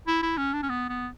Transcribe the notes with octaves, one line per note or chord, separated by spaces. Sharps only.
E4
E4
C#4
D4
C#4
B3
B3